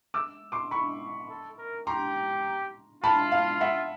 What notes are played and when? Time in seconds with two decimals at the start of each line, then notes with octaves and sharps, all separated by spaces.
0.14 D6 E6
0.52 C6 D6
0.71 B5 C#6
1.29 A4
1.58 A#4
1.87 G4 A#5 C6
3.03 F4 A5 B5
3.32 F5
3.61 E5 F#5